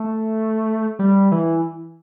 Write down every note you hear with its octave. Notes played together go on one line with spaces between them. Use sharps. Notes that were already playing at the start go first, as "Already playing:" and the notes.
Already playing: A3
G3
E3